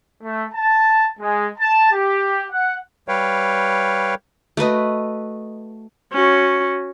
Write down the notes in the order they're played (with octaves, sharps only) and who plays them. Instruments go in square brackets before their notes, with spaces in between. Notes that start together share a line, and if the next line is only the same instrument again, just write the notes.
[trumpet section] A3
A5
G#3
A5
G4
F#5
[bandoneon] G3 B4 C#5 F5 G5
[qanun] A3 F#4 B4 D#5
[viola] C#4 F#4